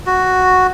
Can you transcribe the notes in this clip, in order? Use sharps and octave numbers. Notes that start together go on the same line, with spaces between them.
F#4